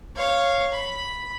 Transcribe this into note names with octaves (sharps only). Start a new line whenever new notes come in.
C#5 F5
B5